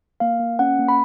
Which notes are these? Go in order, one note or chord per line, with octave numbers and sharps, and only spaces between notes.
A#3 F5
A#3
C#4 F#5
A#3
B5